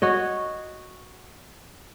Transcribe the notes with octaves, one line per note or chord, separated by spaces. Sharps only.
F#4 C#5 D#5